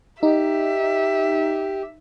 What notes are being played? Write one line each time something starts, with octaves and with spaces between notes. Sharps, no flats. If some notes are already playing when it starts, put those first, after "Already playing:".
D#4 G4 E5